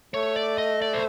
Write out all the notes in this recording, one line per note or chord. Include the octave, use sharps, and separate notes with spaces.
A3 C#5
D5
D#5
D5
C5